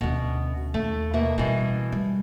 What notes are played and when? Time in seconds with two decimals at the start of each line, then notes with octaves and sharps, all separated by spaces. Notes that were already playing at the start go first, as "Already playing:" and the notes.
0.01 D2 B2 C#4
0.74 D#2 A3
1.14 B2 A#3 E5
1.38 B2 E3 G3 C#4
1.92 G3